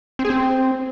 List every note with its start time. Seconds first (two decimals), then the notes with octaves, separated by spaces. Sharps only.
0.19 C4
0.25 G#4
0.30 C4